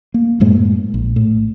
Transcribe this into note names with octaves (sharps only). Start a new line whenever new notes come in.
A#3
F#2 A2 G#3 A#3
A#1
A2